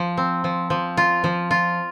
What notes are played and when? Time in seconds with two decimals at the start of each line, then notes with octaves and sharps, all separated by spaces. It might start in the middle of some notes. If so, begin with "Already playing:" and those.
Already playing: F3
0.17 C4
0.44 F3
0.70 F3
0.97 F4
1.24 F3
1.51 F4